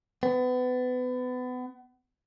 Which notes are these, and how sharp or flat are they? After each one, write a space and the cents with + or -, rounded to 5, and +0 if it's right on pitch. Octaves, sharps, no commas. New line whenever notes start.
B3 +30